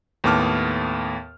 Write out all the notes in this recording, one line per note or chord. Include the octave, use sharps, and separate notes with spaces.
D#2 A2 B3 A5 D6 F6